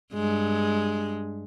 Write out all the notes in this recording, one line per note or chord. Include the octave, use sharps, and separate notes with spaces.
G2 G#3